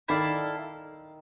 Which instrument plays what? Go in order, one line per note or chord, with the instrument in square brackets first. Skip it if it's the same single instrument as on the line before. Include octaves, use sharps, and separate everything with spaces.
[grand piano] D#3 [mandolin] E4 A4 D5 F5